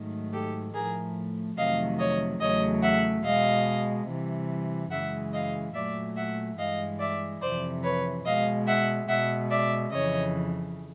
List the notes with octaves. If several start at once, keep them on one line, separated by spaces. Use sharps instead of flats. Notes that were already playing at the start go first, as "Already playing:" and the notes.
Already playing: G#2 D#3 F#3 A3
G4 A4
A2 F3 A3 G#4 A#4
F2 C3 D#3 F#3 A3 D#5 F5
C#5 D#5
E2 C#3 F#3 A3 C#5 D#5
E5 F#5
B2 G#3 D#5 F5
C3 E3 G3
F#2 C#3 E3 G#3 E5 F#5
D#5 F5
A#2 F#3 A3 D5 E5
E5 F#5
G2 E3 G#3 D#5 F5
D5 E5
F2 C3 E3 C5 D5
B4 C#5
B2 G#3 D#5 F5
E5 F#5
B2 G#3 E5 F#5
D5 E5
F2 C#3 E3 C#5 D#5